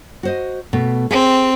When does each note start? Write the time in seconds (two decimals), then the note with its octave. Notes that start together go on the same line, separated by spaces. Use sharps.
0.23 F#4 C5 D#5
0.73 B2 A3
1.11 C4 G#4